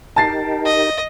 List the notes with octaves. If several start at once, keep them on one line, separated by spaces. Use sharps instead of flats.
D#4 G4 A#4 A5 A6 C7
D#5